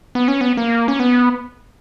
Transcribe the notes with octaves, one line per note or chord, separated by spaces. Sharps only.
B3
C#4
B3
A#3
C#4
B3